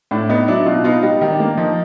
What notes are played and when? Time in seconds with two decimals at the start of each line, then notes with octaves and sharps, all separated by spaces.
0.11 A2 D4
0.29 B3 D#4
0.48 F#3 D4 E4
0.66 B2 D#4 F4
0.84 B3 D#4 F4
1.03 G3 D#4
1.21 D#3
1.31 D4
1.40 A#3
1.57 F3 D#4